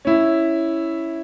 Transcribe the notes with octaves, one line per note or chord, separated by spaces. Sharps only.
C#4 E4